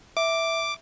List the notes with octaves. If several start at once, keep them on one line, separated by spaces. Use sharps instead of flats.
E5 D6